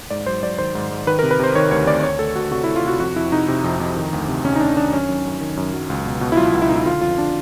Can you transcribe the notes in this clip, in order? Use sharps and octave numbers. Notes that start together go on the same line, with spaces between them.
G#2 D5
F#3 C5
F#3 D5
D#3 C5
G#2
G#2
D#3 B4
A#4
C3
B4
C3 C5
D#3 C#5
D2 C#5
D2 D5
D2 C#5
D2 A4
D2 F#4
C3 F#4
E4
C3
F4
C3 F#4
F2 F#4
F2 E4
C3 D#4
C3
F2
F2
D#3
D2
C3
C3 C#4
D#4
D2 D4
D#3 D4
F#2 C#4
F#2
F#2
D#3
F#2
F#3
C#2
B2
B2
E4
F#3 F4
C#2
E4
B2 D#4
E4
D3 F4
F2 F4
D3 D4